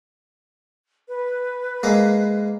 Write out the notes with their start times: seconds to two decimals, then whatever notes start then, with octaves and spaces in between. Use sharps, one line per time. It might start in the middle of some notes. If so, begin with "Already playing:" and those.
1.08 B4
1.83 G#3 A#3